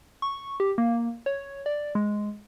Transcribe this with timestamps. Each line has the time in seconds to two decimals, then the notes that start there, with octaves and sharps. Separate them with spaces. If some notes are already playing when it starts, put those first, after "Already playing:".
0.22 C#6
0.60 G4
0.78 A#3
1.26 C#5
1.66 D5
1.95 G#3